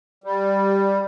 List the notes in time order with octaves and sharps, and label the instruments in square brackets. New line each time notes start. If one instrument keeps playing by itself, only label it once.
[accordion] G3